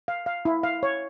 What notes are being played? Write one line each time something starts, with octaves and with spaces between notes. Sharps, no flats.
F5
F5
E4
F5
C#5